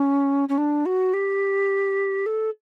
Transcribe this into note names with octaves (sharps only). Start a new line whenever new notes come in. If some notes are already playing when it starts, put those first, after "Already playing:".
Already playing: C#4
C#4
D4
F#4
G4
A4